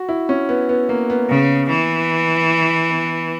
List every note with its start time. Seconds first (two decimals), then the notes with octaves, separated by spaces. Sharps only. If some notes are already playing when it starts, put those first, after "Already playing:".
Already playing: F#4
0.09 E4
0.29 C#4
0.49 B3
0.69 B3
0.89 A#3
1.10 B3
1.29 C#3
1.70 E3
2.91 B3